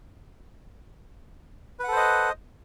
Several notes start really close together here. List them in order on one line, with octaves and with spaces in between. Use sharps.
B4 F#5 A4 C5 D#5